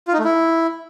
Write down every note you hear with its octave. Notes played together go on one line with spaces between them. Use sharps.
F4
D#4
A3
E4